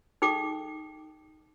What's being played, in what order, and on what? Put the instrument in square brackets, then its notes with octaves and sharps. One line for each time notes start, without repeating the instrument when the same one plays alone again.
[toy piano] D#4 G#4 A4 G5 D6